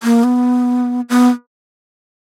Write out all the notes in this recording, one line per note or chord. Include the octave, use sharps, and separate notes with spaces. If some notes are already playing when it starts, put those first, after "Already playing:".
A#3
B3
B3